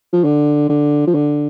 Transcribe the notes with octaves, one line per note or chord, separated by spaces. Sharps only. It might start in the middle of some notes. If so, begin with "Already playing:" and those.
F3
D3
D3
F3
D3